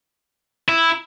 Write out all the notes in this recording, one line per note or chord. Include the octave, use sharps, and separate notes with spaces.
E4